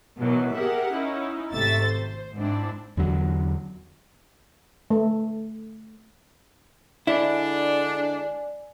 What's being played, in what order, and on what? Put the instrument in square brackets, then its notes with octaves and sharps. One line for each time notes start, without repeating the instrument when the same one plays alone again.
[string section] B2 D#3 E3 F#3
G4 G#4 A#4 E5 F#5
C#4 D#4 E4
G#1 C3 A3 E5 A6
C5
G#2 C4 D4 E4
[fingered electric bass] E2 D3 F#3
[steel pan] A3
[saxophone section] D3 G#3 D4 [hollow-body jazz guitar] E4 [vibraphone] D5 G#5